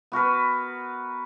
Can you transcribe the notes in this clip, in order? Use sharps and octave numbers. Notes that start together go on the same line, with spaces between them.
B3 F#4 A#4 B4